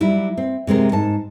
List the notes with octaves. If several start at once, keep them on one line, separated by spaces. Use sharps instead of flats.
F#3 G3 E4
C4
C3 G#3 C4 A#4
G#2 A5